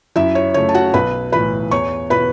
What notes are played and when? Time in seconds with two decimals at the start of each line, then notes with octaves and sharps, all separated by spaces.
0.16 F#2 E4 E5
0.35 C#5
0.54 C#3 A3 C#5
0.69 A5
0.74 F#4 F#5
0.94 B1 B4 B5
1.32 A2 E3 B4 B5
1.71 E2 C#5 C#6
2.10 B2 B3 E4 B4 B5